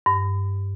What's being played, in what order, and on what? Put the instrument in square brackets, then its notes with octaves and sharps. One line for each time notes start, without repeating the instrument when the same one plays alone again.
[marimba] G2